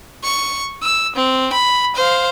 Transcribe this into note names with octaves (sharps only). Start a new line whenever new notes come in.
C#6
E6
C4
B5
C5 F5